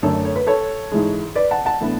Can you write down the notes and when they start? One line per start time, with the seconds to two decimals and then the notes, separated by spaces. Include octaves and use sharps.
0.02 F#2 D3 A3 D4 A4 C#5
0.25 C#5
0.36 B4
0.47 A4 C#5
0.91 G#2 E3 G#3
1.35 B4 D5
1.51 F#5 A5
1.65 F#5 A5
1.80 A2 E3 B3 D4